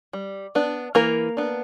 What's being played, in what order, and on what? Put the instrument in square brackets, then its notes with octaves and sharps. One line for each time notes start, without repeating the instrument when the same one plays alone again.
[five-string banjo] G3
B3 D4
E3 A#3 A#4
B3 D4